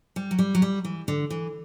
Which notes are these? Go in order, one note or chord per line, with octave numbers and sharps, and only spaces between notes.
G3
F#3
G3
F#3
G3
E3
D3
E3